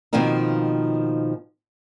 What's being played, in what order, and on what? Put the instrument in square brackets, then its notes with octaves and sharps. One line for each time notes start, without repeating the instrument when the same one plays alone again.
[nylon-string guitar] B2 D#3 F3 A#3 C4 D#4